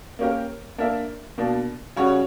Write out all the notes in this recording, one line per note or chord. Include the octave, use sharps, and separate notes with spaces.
A#3 C#4 G4 A#4
A#3 D4 A#4 E5
B2 A#3 D4
C#3 G3 C#4 F#4 C#5